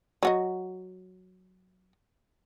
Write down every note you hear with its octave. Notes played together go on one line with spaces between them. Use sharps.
F#3 F#4 D#5